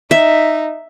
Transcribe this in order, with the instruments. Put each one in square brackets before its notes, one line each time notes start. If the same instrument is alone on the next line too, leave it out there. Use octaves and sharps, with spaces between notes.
[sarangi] D#4 [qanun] E5